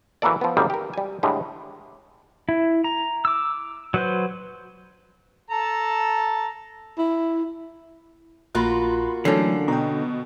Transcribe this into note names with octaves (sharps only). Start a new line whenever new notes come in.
E3 F#3 A#3 A4 D5
F3 B3
G#1 F#2 G3 A#3 G#4 G5
G4 A#4
G3 G#5
A2 D3 G3 G#3
E4
A#5
D6 E6
F#3 B4 C5
A4 A5 A#5
E4
A#1 A#3 F4 F#4 B5 C6 F#6
D3 E3 F#3 A3 C#4 A4 A5 C7
B2 G5 A#5